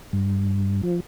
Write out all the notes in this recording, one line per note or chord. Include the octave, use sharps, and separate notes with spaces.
G2
F3